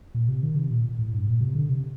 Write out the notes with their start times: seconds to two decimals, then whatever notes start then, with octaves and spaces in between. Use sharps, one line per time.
0.14 A#2
0.28 C3
0.43 D#3
0.56 C3
0.70 A#2
0.99 A2
1.13 G2
1.27 A#2
1.41 C3
1.55 D3
1.69 C3